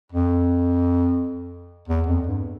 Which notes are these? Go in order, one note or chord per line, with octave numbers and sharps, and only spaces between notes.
F2
E2
F2
G2